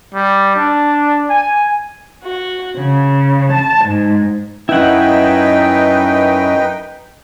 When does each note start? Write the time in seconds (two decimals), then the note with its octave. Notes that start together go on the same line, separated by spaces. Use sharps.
0.14 G3
0.56 D4
1.30 G#5
2.23 F#4
2.76 C#3
3.53 A5
3.85 G#2
4.69 F#2 D#4 E4 B4 F#5 G5